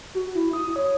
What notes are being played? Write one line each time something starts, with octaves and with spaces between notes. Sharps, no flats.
F#4
E4
D#6
C#5